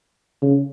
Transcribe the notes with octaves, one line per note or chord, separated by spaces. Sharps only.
C#3